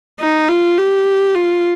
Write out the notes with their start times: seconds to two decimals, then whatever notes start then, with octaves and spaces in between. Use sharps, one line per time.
0.21 D#4
0.49 F4
0.77 G4
1.35 F4